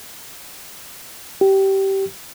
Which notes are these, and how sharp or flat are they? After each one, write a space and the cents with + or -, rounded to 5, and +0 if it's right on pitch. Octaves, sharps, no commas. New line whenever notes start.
G4 -20